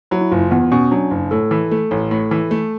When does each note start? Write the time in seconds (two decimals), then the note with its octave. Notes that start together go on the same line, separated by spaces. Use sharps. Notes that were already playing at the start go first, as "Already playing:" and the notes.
0.11 F#3 E4
0.21 E4
0.31 F#1 F4
0.51 E2 B3
0.71 B2 C#4
0.91 F#3 D4
1.11 F#1
1.31 A2 A4
1.51 E3
1.71 A3
1.91 A1
2.11 A2
2.31 E3
2.51 A3